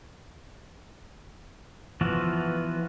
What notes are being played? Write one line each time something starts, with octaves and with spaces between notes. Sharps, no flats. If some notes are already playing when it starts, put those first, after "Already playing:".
E3 F3 B3 F4 F#4